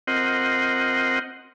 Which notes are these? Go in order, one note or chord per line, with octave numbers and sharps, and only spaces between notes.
C4 F4 A#4 C5 D#5 F#5